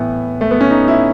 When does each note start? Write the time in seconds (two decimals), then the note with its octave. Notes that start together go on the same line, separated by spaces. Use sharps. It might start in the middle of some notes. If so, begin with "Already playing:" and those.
Already playing: A2 E3 B3
0.41 A3
0.51 B3
0.61 C#4
0.71 D#4
0.88 E4